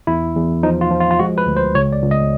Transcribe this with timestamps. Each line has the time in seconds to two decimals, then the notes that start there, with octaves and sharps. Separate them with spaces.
0.07 E2 E4
0.35 E2
0.63 F3 D#4
0.81 F4
0.91 F3
1.00 F4
1.11 F4
1.19 G#3 F#4
1.38 B4
1.47 D2
1.57 C5
1.75 C#2 C#5
1.93 D5
2.02 C#2
2.11 D#5